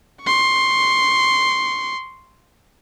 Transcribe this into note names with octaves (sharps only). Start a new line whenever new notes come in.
C6 C#6